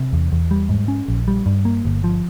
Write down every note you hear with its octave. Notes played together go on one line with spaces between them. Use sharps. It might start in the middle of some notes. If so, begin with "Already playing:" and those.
Already playing: C3
E2
E2
G3
G#2
C#4
A#1
G3
G2
A#3
G1
F3